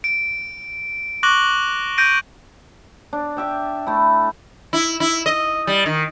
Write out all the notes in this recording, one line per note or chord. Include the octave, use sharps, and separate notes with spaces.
D7
C#6 D6 F#6 A#6 F#7 G7
G6 A#6 D7 D#7
D4
G4 E5 G5
A3 E4
E4
E4
D#5
G3
D#3